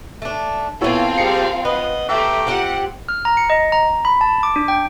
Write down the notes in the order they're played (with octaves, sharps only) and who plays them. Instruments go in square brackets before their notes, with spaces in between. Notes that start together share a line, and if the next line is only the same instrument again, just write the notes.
[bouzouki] A3 D4
[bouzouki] A#2 A4 [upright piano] B3 E4 C#5 [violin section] C4 F4 F5
[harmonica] G3 G#4 A#5 [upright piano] C7 C#7
[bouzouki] B4 [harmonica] D#5 F#5
[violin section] A3 [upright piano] E5 [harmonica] G5 A#5 D6
[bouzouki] C4 F4 G4 [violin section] F#5
[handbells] F6
A#5
C#7
D#5
A#5
B5
A5
D6
D4
G5